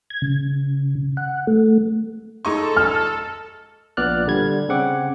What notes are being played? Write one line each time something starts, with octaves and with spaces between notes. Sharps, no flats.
G#6
C#3
F#5
A3
G#3 D#4 A4 C#6
F6
A#1 A#2 B3 D5 F6 F#6
D3 G3 G#6
C#3 C4 F#5 D6